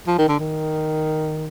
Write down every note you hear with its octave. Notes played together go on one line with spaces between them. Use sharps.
F3
D#3
D3
D#3